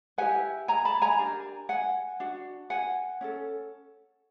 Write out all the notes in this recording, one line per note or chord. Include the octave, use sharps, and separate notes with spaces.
E4 G4 B4 F#5 G#5
G#5 A#5
A5 B5
G#5 A#5
D4 G4 A#4
F#5 G#5
D4 F#4
F#5 G#5
C#4 E4 A4